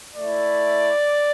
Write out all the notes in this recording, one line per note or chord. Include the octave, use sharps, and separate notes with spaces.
A3 E4 D5